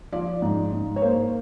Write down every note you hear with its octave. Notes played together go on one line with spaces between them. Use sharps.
F3 D5
G#2
G#2
C#5
A#3 C5